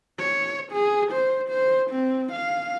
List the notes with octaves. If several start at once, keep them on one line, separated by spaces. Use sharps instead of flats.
C#5
G#4
C5
C5
C4
F5